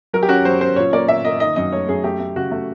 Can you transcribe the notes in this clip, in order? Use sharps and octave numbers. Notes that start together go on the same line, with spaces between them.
F#3 A#4
G4
C#4 F#4
F#3 C5
C#4 C5
A#2 C#5
A#3 D5
A#2 E5
A#3 D#5
D#3 D#5
F#2 D#5
A3 C#5
F#2 G#4
A3 G4
A3
C#3 F#4
A3